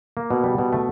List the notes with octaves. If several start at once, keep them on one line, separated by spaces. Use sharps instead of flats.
A#3
B2
G3
B2
A3